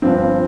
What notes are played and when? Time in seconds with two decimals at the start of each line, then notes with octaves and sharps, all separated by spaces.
0.02 G1 G2 F3 C4